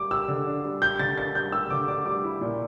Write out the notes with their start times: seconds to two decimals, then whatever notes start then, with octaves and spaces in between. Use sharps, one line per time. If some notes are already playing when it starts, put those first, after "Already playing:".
Already playing: G3 D6
0.11 G4 E6
0.28 D3
0.47 D4
0.64 G3
0.82 G4 G6
0.99 D3 A6
1.17 D4 A6
1.34 G3 G6
1.52 G4 E6
1.70 D3 D6
1.88 D4 D6
2.06 G3 D6
2.23 E4
2.41 A#2